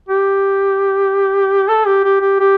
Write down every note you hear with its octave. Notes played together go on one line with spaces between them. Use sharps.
G4
A4
G4
G4
G4
G4